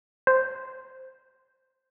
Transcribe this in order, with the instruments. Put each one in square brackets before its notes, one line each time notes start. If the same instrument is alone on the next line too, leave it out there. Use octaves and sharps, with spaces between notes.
[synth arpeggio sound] C5